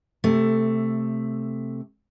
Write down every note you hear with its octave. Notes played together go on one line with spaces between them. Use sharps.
C3 A3